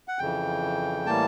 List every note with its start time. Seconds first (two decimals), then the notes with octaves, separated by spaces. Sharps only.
0.08 F#5
0.19 F2 C#3 E3 G5
1.06 A2 E3 G3 A#3 A5